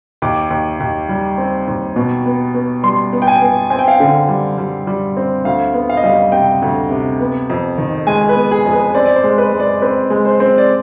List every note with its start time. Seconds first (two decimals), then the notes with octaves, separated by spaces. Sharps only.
0.22 D#2 D6
0.50 D#2
0.80 D#2
1.09 G3
1.38 C4
1.67 D#2
1.96 B2
2.26 B3
2.54 B3
2.83 G3 C6
3.13 B3
3.22 G5
3.27 G#5
3.41 B3
3.70 C4 G#5
3.79 G5
3.88 F5
3.96 D3 G5
4.28 G3
4.58 G3
4.87 G3
5.17 C4
5.45 D2 F5
5.74 B3
5.89 F5
5.97 D#5
6.04 G3 F5
6.32 C3 G5
6.62 D2
6.91 C3
7.20 B3
7.50 F2
7.78 D#3
8.07 G#3 G#5
8.29 B4
8.36 B3
8.51 G#4
8.66 F2
8.73 B4
8.94 C4 D5
9.06 D5
9.16 C5
9.24 G#3
9.38 B4
9.53 G#3
9.60 D5
9.82 C4 B4
10.10 G#3
10.25 C5
10.40 C4
10.58 D5